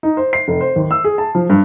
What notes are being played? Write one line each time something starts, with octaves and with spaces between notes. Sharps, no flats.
D#4
C5
C7
F1
C5
D#2
E6
G#4
A5
F3
G2